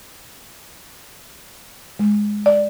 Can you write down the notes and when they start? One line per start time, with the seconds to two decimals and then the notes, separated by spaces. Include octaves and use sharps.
1.99 G#3
2.46 D5